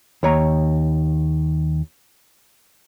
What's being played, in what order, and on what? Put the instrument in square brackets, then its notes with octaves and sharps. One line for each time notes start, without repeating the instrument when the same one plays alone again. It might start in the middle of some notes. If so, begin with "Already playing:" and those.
[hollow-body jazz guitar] D#2 C#5 A#5